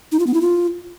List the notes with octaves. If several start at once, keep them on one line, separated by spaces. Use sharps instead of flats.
D#4
F4
B3
E4
F4